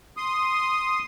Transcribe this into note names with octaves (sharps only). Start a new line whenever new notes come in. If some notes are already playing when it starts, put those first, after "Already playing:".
C6 D#6